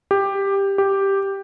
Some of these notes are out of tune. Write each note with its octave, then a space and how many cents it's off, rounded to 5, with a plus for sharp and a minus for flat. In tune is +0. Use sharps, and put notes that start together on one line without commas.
G4 +10
G4 +0